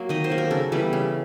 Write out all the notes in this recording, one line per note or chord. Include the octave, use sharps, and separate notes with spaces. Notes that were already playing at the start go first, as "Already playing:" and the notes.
Already playing: F#3 A#3
D#3 D#5
C5
F#3 A#3
A#4
C#3 A4
E3 G3 B3
C#3